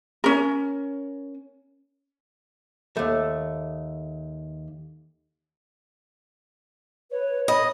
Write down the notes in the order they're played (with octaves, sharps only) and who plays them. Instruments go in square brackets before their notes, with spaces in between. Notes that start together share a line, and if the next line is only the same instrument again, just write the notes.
[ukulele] C#4 A#4
[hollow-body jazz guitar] D#2 A3
[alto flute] B4 [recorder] C#5
[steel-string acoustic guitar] D#5 [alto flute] B5